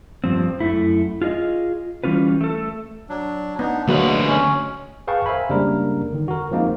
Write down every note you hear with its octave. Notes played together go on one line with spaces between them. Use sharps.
G2 F3 C4
F#2 A3 E4
F4 G#4 D5 D#5
E3 G3 C#4 F4 B4
A3 A4
F#3 D4
B3 D4 D#4
D2 B2 F#3 G#3 A#3 B3 B4
C#4
G#4 B4 F5 G5 A5 C#6
A#4 C5 E5 F5 G#5 B5
C#3 G3 G#3 A#3 D4 A#4
D3 D#3
F#4 A#4
F3 G#3 A#3 C4 D#4